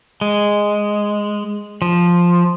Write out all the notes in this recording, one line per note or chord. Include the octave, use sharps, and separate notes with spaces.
G#3
F3